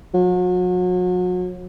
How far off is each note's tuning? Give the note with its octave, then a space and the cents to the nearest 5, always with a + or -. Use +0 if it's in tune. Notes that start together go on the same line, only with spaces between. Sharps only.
F#3 -35